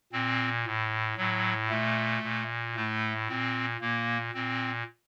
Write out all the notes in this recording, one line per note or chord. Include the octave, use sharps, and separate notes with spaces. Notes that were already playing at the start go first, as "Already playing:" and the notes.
A#2 C4
A2
A2 F#3
A#2 A3
A#2
A2 A3
A#2 C4
A#2 A#3
A#2 C4